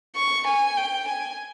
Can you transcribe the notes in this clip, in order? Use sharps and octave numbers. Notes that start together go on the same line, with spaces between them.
C#6
G#5
G5
G#5